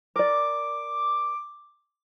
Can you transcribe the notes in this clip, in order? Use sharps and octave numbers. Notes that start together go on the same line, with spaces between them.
A#4 D5 D6